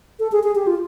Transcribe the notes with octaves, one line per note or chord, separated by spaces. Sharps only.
A4
G#4
G#4
G4
F4